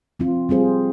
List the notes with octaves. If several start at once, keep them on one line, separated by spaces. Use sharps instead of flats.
F3 C4 F4
G3 C4 F4 G#4 C5